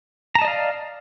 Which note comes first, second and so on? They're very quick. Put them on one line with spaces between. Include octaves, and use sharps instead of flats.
A#5 A5 D#5 D5 F5